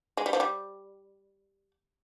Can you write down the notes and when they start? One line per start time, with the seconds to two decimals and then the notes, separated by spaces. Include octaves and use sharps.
0.17 G#3
0.26 G3
0.33 F3
0.40 G3